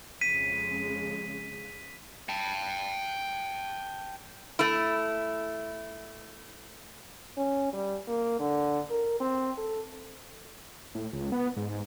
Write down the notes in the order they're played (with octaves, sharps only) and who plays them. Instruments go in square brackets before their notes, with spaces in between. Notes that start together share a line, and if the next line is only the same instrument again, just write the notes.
[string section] F2 C#3 G#3 [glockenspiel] B6 D#7
[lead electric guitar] G5 A5
[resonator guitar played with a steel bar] A3 E4
[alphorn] C#4
G3
A#3
D3
A#4
C4
A4
[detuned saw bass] A2
C#2
B3
G#2